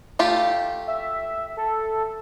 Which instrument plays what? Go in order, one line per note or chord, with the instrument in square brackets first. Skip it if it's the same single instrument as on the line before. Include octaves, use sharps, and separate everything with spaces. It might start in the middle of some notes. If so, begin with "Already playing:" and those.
[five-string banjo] A3 F4 G4
[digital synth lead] E5
A4